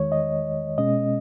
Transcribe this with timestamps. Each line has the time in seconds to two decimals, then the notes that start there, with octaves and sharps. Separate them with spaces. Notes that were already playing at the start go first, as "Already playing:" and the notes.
Already playing: E2 D#3 G#3 C#5
0.12 D#5
0.78 B2 G#3 C#4 D#5